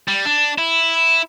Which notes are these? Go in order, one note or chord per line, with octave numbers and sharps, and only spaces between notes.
G3
D4
E4